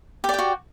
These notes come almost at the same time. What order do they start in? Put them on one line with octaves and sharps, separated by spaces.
G4 D5 G5 F#4